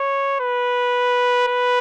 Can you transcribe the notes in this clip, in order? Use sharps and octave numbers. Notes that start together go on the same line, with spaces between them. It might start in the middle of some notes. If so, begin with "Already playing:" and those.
Already playing: C#5
B4
B4